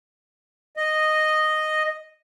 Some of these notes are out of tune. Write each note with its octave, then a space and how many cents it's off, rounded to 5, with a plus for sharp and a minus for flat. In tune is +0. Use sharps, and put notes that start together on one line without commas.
D#5 -5